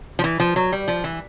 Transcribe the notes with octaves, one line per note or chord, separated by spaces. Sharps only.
F3
E3
F3
F#3
G3
F3
E3